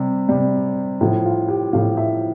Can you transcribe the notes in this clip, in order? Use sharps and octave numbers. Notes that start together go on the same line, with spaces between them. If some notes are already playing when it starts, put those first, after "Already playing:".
Already playing: C3 G3
C3 G3
A2 F3 E4
F4
G4
A2 F3 F5
E5